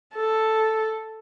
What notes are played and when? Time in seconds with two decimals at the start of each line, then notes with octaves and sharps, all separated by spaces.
0.15 A4